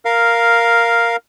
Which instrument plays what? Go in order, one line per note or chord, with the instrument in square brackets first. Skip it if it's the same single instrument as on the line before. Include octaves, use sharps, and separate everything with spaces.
[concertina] A#4 F5